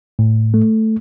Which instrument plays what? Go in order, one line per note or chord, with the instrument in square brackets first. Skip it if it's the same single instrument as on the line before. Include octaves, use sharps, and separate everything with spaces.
[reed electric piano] A2
A3